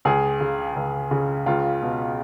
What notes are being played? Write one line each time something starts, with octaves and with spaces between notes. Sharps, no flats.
C#2 G#4
C#3
C#2
C#3
C#2 F4
B2